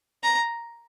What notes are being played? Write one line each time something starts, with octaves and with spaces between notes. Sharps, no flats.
A#5